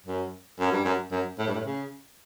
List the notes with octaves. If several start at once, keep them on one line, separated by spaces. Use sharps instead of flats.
F#2
F#2
G2
F#2
F#2
A2
G2
A2
C#3